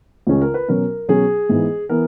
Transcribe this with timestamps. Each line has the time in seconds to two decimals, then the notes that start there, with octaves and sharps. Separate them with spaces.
0.27 C#2 C#3 G#3 C#4
0.41 A#4
0.54 B4
0.68 B2 F#3 C#4 A#4
1.09 B2 F#3 C#4 G#4
1.49 G#2 E3 B3
1.89 E3 B3 A#4